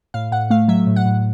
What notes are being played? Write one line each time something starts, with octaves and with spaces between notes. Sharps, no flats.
A2 F5
A2 F#5
A3 F5
F#3 E5
A2
F#5
A2